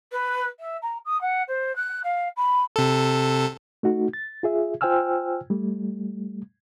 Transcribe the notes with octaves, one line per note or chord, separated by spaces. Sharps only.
B4
E5
A#5
D#6
F#5
C5
F#6
F5
B5
C3 A4
A3 D#4 F#4
A6
F4 G#4 E5
F4 C5 G5 G#5 E6 F6
G3 A3